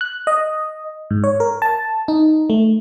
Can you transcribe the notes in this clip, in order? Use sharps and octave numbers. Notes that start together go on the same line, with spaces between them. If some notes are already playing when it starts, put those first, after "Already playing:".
F#6
D#5
G#2
C#5
A#4
A5
D#4
A3